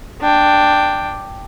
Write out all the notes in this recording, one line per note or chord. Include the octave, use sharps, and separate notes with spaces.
D4 G5